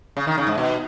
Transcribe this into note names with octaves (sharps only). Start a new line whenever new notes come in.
C#3
D#3
C#3
G#2
B2